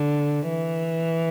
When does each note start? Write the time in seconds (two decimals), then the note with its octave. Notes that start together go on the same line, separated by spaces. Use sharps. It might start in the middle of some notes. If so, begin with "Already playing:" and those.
Already playing: D3
0.49 E3